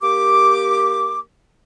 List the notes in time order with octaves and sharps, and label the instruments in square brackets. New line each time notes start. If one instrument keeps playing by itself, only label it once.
[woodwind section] A#3 G4 D6